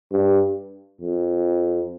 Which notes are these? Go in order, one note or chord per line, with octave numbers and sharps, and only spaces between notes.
G2
F2